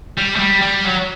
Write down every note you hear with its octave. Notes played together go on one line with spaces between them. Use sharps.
G3
A3
G3
G3
F#3